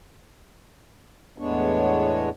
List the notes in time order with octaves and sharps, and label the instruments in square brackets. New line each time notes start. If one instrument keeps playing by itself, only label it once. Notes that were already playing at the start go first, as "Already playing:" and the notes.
[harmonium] E2 A2 G#3 B3 D4 C#5